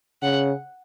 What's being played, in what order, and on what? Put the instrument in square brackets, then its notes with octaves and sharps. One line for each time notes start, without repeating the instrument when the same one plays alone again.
[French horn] C#3 [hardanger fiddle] F#5